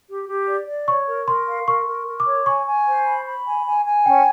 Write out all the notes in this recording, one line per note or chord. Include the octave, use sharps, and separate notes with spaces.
G4
G4
D5
D5
C#5 C#6
A#4
A#4 C6
F5
A#4 C#6
A#4
A#4
D6
C#5
G#5 C#6
G#5
C5
B5
B5
G#5
G#5
G#5
C#4 G5